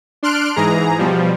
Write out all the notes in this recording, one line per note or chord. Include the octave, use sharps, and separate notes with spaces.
D4 C6 F6 F#6 D7
G#2 E3 G#4 A#5
B2 F3 G3